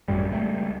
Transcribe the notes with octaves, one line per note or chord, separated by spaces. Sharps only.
G#1 F#2 A2 G3
C#2 G3 A3